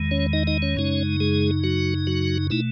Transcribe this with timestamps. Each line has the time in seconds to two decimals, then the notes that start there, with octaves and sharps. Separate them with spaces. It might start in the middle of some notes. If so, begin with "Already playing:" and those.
Already playing: E2 D#3 G#3
0.11 C#4 C#5
0.33 D#4 D#5
0.47 D#4 D#5
0.62 C#4 C#5
0.76 F#2 C#3 G#3 D#4
1.20 G#3 G#4
1.63 F#3 F#4
2.07 F#3 F#4
2.50 B2 A3 D#4 E4